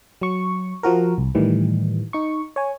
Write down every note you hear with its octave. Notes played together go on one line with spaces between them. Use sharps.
F#3 C#6
F3 F#4 A#4
C2
A2 D#3 E3 G3
D#4 C#6
C#5 G#5